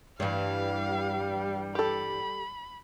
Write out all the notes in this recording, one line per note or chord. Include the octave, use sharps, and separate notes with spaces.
G2 E3 G3 F5
G4 A4 B5